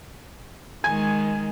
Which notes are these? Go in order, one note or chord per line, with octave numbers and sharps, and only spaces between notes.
D#3 G#3 G#5 G#6